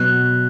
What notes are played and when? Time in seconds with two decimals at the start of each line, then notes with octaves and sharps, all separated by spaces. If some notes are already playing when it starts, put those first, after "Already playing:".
Already playing: B2 F#3 B3 F#6